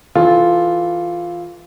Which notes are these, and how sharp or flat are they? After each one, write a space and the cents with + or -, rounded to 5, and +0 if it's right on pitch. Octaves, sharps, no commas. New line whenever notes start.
E3 +0 F4 +0 A4 -20